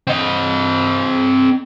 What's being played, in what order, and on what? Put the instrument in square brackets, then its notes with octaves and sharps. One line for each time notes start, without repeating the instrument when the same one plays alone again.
[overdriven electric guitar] C4 D#5